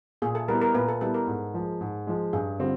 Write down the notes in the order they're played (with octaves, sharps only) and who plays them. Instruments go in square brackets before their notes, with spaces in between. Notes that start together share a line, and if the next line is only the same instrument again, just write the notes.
[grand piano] A#2 [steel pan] G#4
[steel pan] A4
[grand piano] G3 B3 E4 [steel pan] A#4
[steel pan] A#4
[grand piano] A#2 [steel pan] B4
[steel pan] A4
[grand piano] G3 B3 E4 [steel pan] A4
[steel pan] A#4
[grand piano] G#2
F3 G#3
G#2
F3 G#3
[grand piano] G2 [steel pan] G#4
[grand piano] D3 G3 C4 F4 [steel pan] G4